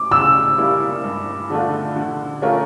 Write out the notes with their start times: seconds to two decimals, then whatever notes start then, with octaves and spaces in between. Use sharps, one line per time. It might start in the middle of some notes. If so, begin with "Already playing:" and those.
Already playing: D6
0.11 C#3 E6
0.58 G3 A#3 E4
1.04 G2
1.50 D3 A3 D4 F4
1.96 D3
2.42 A3 C#4 F4 A#4